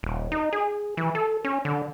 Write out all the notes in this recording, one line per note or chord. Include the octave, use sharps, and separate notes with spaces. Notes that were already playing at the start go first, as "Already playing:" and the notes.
D#1
D#4
G#4
E3
A4
C#4
D3